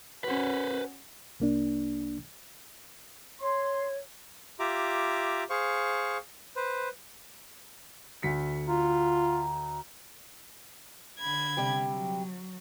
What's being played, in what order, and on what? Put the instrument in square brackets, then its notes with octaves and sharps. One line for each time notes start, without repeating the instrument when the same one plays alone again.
[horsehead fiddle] C#4 F#4 [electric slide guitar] B4 C5
[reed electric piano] C2 A#3 D4
[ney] C#5 [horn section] C6
[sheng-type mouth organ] F4 G4 E5 A#5 D6
G#4 C5 F5 C#6
B4 C5
[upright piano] D2 B6 C#7
[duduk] F4 [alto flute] A#5
[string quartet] D3 B5 G#6
[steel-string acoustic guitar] C3 G3 G5
[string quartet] F#3